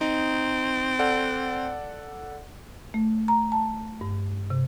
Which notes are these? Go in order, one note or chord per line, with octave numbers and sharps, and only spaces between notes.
C4 D#4
A4 D5 F#5
A3
A#5
A5
G2
C3